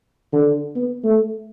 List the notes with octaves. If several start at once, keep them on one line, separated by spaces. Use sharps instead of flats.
D3
B3
A3